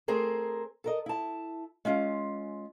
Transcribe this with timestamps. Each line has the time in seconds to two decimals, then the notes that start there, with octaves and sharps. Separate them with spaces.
0.08 A3 C4 G#4 A#4 C5
0.84 A4 A#4 D#5
1.06 E4 A5
1.85 G#3 C#4 F4